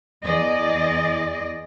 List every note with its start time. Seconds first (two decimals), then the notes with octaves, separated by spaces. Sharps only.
0.23 E2 G#4 D5 D#5